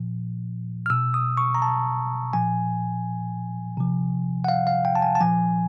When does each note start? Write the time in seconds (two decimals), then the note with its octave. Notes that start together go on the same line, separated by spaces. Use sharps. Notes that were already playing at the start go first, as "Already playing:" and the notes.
Already playing: A#2 F3
0.86 F6
0.90 B2 E6
1.14 D#6
1.37 C#6
1.55 A#5
1.62 A5
2.33 A#2 F3 G#5
3.77 C3 F3
4.44 F#5
4.48 F5
4.67 F5
4.85 G5
4.95 A5
5.02 G#5
5.15 A5
5.21 A#2 F3 G#5